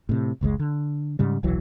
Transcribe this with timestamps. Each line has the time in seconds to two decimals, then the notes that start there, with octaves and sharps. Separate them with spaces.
0.09 A2 C3
0.41 F#1 C#2 B2 G#3
0.59 D3
1.19 G#2 C#3 G3
1.43 D#1 B1 E3 F#3